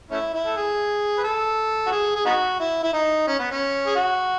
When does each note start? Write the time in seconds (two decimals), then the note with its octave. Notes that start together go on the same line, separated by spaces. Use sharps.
0.11 A3 C#4 E4
0.34 E4
0.46 A4
0.57 G#4
1.18 B4
1.24 A4
1.87 F#4
1.92 G#4
2.16 G#4
2.26 B3 D#4 F#4
2.60 E4
2.83 E4
2.94 D#4
3.28 C#4
3.40 B3
3.51 C#4
3.86 G#4
3.95 F#4